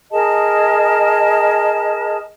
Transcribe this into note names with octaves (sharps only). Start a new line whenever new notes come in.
G#4 A#4 D#5 A5